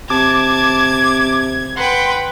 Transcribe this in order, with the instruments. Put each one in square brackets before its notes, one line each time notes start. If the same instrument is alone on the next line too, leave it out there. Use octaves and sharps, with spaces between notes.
[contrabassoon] C3 [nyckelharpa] A5 [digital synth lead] D6 [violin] G#6
[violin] B4 G5 [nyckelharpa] F#5 [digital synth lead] C6